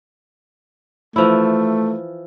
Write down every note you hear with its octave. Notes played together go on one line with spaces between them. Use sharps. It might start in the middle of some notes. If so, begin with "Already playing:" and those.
E3 F3 A3 E4